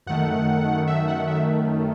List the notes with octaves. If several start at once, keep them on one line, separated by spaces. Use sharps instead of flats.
F#2 D#3 A3 F#5
E5
F#5
E5